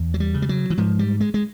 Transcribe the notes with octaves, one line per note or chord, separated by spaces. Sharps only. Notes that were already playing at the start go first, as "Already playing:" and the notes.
Already playing: E2
F#3
G3
C#3
G3
F#3
E3
G#2 F3
G3
G#3
G#3